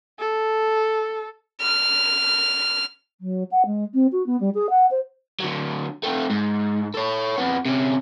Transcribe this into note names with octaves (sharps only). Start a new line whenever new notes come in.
A4
F6
F#3
F#5
G#3
C4
F#4
B3
G3
G#4
F#5
C5
D3 F#3
A3 C4
G#2
A4 C#5
F2 B3
C3 C#4